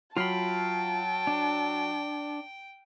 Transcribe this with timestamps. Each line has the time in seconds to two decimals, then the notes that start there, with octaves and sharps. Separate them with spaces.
0.17 F#3 F4 G5 A5 B5 F6 C7
1.27 D4